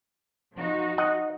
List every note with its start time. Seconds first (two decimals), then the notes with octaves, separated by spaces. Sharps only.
0.56 F3 D#4 F#4
0.98 D#5 F#5